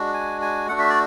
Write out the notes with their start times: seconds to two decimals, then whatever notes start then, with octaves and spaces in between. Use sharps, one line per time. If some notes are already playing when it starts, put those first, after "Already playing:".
Already playing: G#3 D4 F#4
0.14 G#5
0.42 G#5
0.69 A3 D4 F#4 F#5
0.79 E5
0.89 D5